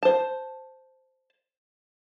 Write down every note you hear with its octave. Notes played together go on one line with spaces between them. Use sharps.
C5 A5